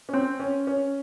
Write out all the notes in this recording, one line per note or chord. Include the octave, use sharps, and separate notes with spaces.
C#4
C4
C#4
C#4